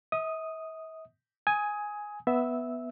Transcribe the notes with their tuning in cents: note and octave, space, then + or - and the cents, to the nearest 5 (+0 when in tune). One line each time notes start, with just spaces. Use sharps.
E5 -45 D#6 -5
G#5 +0 D#6 +20
B3 +0 E5 +0 E6 -15